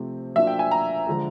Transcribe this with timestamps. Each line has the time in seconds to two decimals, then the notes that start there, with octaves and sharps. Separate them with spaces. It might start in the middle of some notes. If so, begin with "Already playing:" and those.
Already playing: C3 F3 A3 C4
0.35 F#3 A#3 D4 F4 E5
0.47 G5
0.59 G#5
0.71 A#5
1.07 D3 F3 G#3